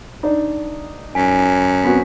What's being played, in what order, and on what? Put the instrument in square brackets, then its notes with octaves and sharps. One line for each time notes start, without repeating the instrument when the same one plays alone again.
[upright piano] D4 D#4
[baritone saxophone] F#2 [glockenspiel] G#5 B6
[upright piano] B3 C4 F#4 [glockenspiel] B6